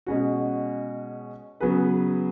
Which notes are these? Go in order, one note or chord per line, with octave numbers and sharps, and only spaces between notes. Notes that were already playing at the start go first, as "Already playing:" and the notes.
B2 G#3 C#4 F#4
C#3 F#3 B3 G#4 B4